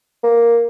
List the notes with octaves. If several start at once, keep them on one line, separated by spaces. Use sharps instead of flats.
A#3